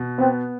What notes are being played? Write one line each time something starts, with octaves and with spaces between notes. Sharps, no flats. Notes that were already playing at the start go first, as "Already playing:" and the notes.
Already playing: B2
B3 C4